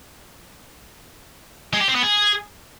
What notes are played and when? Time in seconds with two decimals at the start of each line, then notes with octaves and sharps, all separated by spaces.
1.73 G#3
1.81 G4
1.88 C4
1.96 B3
2.03 G#4